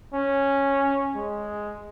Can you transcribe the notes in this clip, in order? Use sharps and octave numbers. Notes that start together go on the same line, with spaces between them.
C#4
G#3